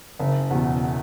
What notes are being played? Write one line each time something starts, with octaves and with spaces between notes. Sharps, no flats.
F#1
E2 B2